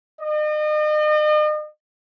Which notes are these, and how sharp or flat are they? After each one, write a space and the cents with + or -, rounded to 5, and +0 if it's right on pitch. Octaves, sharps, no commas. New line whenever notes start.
D#5 -40